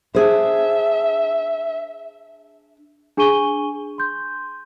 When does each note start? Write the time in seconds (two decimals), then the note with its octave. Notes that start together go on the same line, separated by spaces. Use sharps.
0.15 D4 G#4 C5 E5
3.17 D4 G#4 G#5 C#6 D#7 G7
3.98 C6 G6